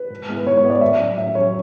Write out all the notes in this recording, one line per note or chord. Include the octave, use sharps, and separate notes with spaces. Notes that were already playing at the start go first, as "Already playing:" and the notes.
Already playing: B4
G#2
G#3 B3 E4
B4
G#2 C#5
C#5
G#3 B3 E4
D5
A2 E5
F#3 C#4
A2 E5
F#3 C#4 C#5